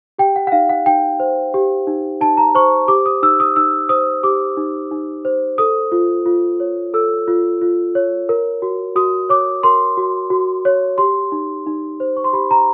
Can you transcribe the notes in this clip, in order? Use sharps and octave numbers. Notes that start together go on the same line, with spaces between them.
G4 G5
F#5
F#5
D#4 F5
F#5
D#4 G5
C5
G4
D#4
D#4 A5
A#5
C5 C#6
G4 D6
D#6
D#4 E6
D#6
D#4 E6
C5 D#6
G4 D6
D#4
D#4
C5
A4 D#6
F4
F4
C#5
A4 E6
F4
F4
C#5
A#4
F#4
F#4 D#6
C#5 D6
A#4 C6
F#4
F#4
C#5
G4 C6
D#4
D#4
C5
C#6
C6
G4 B5
A#5